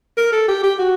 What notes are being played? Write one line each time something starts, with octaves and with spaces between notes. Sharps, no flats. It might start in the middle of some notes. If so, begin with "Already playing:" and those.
A#4
A4
G4
G4
F#4